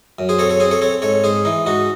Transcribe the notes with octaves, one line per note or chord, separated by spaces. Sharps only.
F#2
G#4 C5
C4 A4 C#5
A4 C#5
C4 G#4 C5
A4 C#5
C4 A4 C#5
G#2 A4 C#5
G#2 G#4 C5
E3 D#4
G#2 D#4 F#4